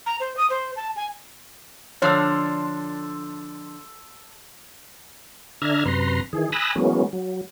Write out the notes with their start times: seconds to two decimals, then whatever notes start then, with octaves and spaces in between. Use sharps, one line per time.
0.06 A#5
0.20 C5
0.37 D#6
0.50 C5
0.76 A5
0.96 G#5
2.02 D3 F3 D4 A4 C#5 C6 E6
5.62 D3 D4 E5 A#5 F6 G#6
5.85 F#2 C3 B4 A#5 C6
6.33 D#3 E3 G#4
6.52 G#5 B5 D#6 E6 F#6 A#6
6.76 E3 F#3 G#3 A#3 B3 C#4
7.13 F#3